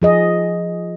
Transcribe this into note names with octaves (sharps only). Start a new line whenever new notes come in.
F3 G#4 D#5